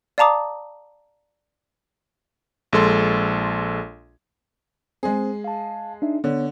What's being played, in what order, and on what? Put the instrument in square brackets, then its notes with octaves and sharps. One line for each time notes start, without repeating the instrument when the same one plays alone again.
[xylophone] D5 F5 A5 A#5 D6 D#6
[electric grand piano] A#1 G#3 A4 C6
[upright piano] G#3 G#4 [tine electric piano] C4 C5
[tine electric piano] F5 A5
D4 D#4 E5
[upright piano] D3 [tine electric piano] B3 C#5